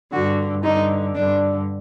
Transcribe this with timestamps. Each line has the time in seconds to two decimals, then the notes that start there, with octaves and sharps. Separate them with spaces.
0.12 G2 D3 F#4
0.63 G2 D3 D#4
1.15 G2 D3 D4